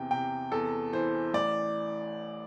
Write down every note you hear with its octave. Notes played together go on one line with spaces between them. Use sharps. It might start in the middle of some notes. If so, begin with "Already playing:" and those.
Already playing: E2 C3 G5
C3 G5
E2 A4
E3 C5
A1 D5